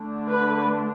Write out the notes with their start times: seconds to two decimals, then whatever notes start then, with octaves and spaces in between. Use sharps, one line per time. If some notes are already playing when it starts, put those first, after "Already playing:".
Already playing: D3 A3 D4
0.28 B4